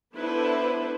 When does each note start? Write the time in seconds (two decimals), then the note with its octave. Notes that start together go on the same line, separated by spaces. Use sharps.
0.16 B3 D4 E4 A4 B4 C5